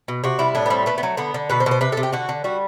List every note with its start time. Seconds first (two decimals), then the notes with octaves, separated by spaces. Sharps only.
0.08 B2
0.24 C3 F#4
0.39 G3 E4
0.55 A2 D4
0.66 B3
0.70 G3 C4
0.86 A3 B3
0.98 B3
1.03 F#3
1.17 D3 B3
1.34 D3
1.49 B2 B4
1.60 C5
1.66 B2
1.71 C5
1.81 C3 B4
1.92 C3 A4
2.03 G4
2.13 D3 F#4
2.29 D3
2.44 G3 F#4